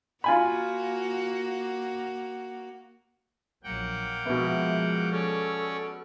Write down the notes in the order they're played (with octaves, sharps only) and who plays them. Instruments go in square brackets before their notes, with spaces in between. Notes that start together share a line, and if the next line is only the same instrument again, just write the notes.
[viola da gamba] A#3 F#4 [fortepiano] F4 G#5 B5
[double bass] A#1 F#3 [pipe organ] A#3 F#5 G5
[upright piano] B2 B3 [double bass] F3 G#3 [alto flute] E5
[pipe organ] C#4 C#5 D5 [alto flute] A4